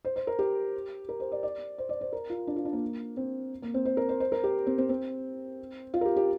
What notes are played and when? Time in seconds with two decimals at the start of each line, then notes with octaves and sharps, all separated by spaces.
0.05 C5
0.16 C5
0.27 A#4
0.39 G4
1.09 A#4
1.20 C5
1.32 D5
1.43 D5
1.78 C5
1.89 D5
2.01 C5
2.13 A#4
2.30 F4
2.47 D4
2.56 F4
2.65 D4
2.73 A#3
3.17 C4
3.62 A#3
3.74 C4
3.85 C5
3.97 A#4
4.09 C5
4.20 C5
4.32 A#4
4.44 G4
4.67 C4
4.78 C4
4.89 C4
5.94 F4
6.01 A#4
6.05 G4
6.16 G4